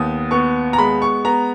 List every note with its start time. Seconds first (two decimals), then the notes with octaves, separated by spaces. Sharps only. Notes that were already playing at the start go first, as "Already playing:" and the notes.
Already playing: D#2 B3 D#6
0.31 B3 C#6
0.73 A#5
0.78 G#3 B5
1.02 C#6
1.25 B3 A#5